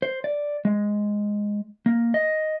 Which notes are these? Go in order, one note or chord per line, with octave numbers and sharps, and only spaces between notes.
C5
D5
G#3
A#3
D#5